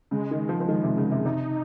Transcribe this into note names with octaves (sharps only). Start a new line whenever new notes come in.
C#3 G#3
D#3
F3
F3
D#3
C3
C#3
C3
C3 D#4